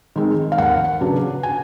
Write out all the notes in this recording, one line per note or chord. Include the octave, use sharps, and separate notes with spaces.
D#3 G#3 C4
F5
D#2 F#5
C#3 F#3 B3 D4
G#5